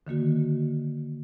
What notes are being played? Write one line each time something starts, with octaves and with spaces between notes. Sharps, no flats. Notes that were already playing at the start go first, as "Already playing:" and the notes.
D3 D#3 A#3 F#4